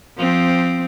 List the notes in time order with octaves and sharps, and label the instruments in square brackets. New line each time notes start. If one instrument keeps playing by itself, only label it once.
[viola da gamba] F3 C4